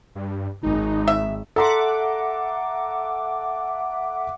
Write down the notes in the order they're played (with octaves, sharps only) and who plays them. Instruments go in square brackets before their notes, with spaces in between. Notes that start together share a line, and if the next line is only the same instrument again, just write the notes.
[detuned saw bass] G2
[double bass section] G#1 [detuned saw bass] D#4
[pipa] E5
[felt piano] A4 A#5 C6 [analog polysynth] E5 F#5 D6